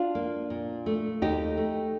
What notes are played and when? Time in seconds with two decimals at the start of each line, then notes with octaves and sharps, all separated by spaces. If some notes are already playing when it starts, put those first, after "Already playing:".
Already playing: D4 F4
0.15 A#3
0.50 A#2
0.86 A3
1.22 D#2 D#4 G4
1.57 A3